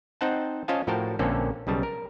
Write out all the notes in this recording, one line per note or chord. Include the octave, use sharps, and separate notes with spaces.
C4 D#4 C5 F#5 G5 A5
C#4 F4 C5 D#5 F5 A5
A2 F3 F#4 A#4 G5 A5
A#1 D3 A#3 C4 C#4 A4
B1 C#3 G3 A5
A#4